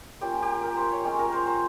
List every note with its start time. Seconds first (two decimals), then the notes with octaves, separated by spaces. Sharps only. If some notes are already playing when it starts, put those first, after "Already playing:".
0.21 A#3 C#4 F4 G4
0.42 G4
0.63 A#4
0.77 C5
0.92 C#5
1.05 G#3 C#4 F4 G4
1.19 A#4
1.33 C5
1.47 C5